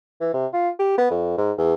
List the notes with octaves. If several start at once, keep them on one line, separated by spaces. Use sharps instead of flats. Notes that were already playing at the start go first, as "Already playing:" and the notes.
E3
C3
F4
G4
B3
F2
G#2
E2